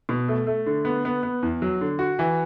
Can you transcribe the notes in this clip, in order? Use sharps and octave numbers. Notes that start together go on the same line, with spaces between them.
B2
A3
A3
D3
B3
B3
B3
E2
F#3
D3
F#4
E3